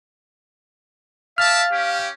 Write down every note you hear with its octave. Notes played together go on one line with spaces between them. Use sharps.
D5 E5 F5 A5 F6
C#4 G4